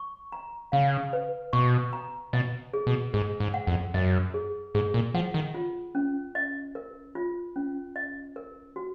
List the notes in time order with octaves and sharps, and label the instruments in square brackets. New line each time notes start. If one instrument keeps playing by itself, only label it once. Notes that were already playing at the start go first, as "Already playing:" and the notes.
Already playing: [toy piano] C#6
A#5
[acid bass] C#3 [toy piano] F5
[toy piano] B4
[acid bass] B2 [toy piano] C#6
[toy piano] A#5
[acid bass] B2 [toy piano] D#5
[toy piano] G#4
[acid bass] B2
[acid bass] G#2 [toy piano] G#4
[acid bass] G#2
[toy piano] F#5
[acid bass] F2
[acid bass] F#2 [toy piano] D#5
[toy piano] G#4
[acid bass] G#2 [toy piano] G#4
[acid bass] A#2
[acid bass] F3 [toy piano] F#5
[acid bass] D#3
[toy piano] F4
C#4
D#5
A#4
F4
C#4
D#5
A#4
F#4